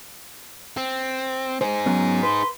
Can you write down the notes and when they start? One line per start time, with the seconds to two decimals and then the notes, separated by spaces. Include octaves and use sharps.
0.77 C4
1.61 D#4 G#4 C5
1.86 F#3 B3 C#4
2.23 B4 C6